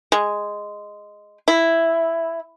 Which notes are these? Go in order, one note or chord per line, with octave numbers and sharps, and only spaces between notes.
G#3
E4